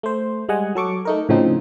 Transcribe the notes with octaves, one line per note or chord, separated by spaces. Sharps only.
A3 C5
G3 G#3 D#5 F#5 G#5
F#3 A4 C#6 D6
A3 D#4 A#4
A2 C#3 F3 C4 D#4